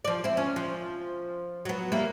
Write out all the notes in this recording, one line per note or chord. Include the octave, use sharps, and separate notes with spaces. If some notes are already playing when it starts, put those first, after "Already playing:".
F3 D5
C4 E4
C#4
F3
F#3 B3
G3 A#3 E4